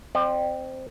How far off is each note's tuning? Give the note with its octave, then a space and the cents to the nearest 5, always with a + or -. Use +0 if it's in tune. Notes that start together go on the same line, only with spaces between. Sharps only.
C4 +0 D5 +45